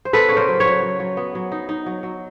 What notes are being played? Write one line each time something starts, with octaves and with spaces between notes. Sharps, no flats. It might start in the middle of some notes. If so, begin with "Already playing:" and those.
C5
B3 A4 B4
C#3 C#5
A#4 C5
F#3
B4 C#5
F#3
F#3
F#3
B3
F#3
D#4
D#4
F#3
F#3